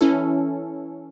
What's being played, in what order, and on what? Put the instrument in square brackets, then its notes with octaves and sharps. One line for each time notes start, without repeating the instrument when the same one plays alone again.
[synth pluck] E3 C#4 E4 A4